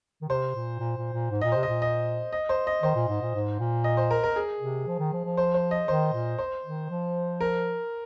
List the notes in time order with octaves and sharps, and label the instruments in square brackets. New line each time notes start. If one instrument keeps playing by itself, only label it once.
[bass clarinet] D#3
[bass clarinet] C3 [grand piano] C5
[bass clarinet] A#2
A#2
A#2
A#2
G#2
[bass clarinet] A#2 [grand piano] D#5
[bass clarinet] C3 [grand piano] C5
[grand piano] D#5
[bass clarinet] A#2
[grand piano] D#5
D#5
C5
D#5
[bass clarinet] D#3 [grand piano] C5
[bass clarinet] A#2
G#2
A#2
G#2
A#2
[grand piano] D#5
C5
A#4
A#4
G#4
[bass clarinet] C3
F3
D#3
F3
F3
[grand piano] C5
C5
D#5
[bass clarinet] D#3 [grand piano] C5
[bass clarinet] A#2
[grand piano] C5
[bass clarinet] D#3
F3
[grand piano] A#4